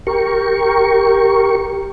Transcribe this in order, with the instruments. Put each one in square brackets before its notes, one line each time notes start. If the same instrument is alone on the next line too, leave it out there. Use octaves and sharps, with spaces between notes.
[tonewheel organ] G4 A#4 C#6